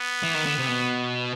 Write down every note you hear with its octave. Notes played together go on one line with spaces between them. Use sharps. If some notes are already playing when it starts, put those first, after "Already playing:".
Already playing: B3
E3
D#3
D3
C3
B2